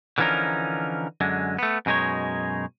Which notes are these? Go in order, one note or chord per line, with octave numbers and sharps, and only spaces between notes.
D3 E3 F3 C#4 D#4 A#4
F#2 D3 G#3
A3 B3
F#2 B2 G#3 D#4 C#5